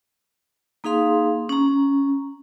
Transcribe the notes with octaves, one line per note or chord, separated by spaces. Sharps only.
A#3 D#4 G#4 F5 C6
C#4 A#5